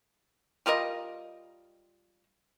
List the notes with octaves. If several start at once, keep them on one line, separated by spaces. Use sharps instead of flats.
G3 F4 A#4 D#5